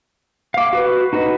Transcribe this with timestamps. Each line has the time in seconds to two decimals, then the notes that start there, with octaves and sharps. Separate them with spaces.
0.54 F5 D6
0.73 F#4 B4
1.13 D#4 F#4 B4 D#5